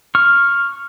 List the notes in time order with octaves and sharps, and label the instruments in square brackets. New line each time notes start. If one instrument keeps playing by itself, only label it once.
[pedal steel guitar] C#6 F6